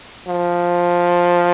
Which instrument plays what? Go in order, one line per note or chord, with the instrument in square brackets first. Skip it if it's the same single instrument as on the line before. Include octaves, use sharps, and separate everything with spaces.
[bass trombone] F3